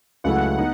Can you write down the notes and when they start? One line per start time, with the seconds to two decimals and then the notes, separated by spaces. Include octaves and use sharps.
0.24 C#2 C#3 F#3 A3 E4 F#5
0.58 B3 D#4